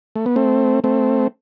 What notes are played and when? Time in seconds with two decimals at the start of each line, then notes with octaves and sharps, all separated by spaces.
0.16 A3
0.26 B3
0.36 A3 C4
0.84 A3 C4